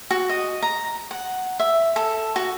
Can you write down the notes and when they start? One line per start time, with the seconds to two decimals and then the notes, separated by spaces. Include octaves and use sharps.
0.11 F#4
0.29 D#5
0.63 A#5
1.11 F#5
1.60 E5
1.96 A4
2.36 F#4